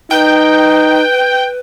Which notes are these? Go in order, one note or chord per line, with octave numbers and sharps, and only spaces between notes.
D#4 B4 G5